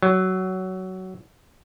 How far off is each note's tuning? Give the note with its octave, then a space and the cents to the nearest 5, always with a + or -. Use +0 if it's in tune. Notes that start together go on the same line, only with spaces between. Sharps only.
F#3 +15